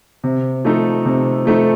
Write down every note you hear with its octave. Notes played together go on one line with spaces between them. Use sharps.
C3
F3 A3 D#4 A4
C3
F3 A3 D#4 A4